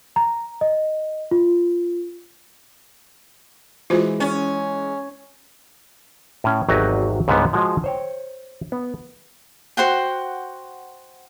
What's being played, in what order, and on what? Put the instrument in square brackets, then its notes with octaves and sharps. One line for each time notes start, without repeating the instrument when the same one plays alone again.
[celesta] A#5
D#5
F4
[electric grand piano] E3 G#3 [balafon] F4 F#4 C5
[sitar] C#4
[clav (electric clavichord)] A2 C#4
G#1 E2 F#3 F#4 G4 D#5
C#2 G#2 D3 G3 B3
F3 G#3 F#4 G#4 C5 D#5
C5 C#5 G5
B3
[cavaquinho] F#4 C5 F#5 G5